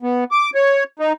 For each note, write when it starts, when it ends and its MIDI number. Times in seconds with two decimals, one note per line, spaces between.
0.03 0.24 59
0.31 0.50 86
0.55 0.84 73
0.99 1.13 63